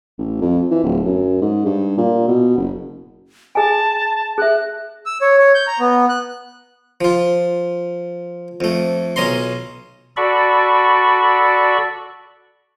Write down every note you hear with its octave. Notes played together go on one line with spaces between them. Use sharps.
A1
F2
E3
D1
F#2
G#2
G2
A#2
B2
F#1
G#4 D#5 G#5 A5
G#4 E5 F#6
E6
C#5
C#5
G6
A#5
B3
F#6
F3 F4
F2 A3
B1 C#4 D#5 A#5 C6
F#4 A4 D5 B5 C#6